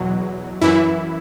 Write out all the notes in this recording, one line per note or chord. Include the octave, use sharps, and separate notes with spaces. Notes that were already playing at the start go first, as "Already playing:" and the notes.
Already playing: E2 B2 F#3
F#2 E3 E4